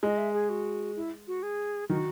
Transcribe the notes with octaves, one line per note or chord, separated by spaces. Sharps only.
G#3 D#5
E5
G#4
F#4
E4
F#4
G#4
D#3 F#4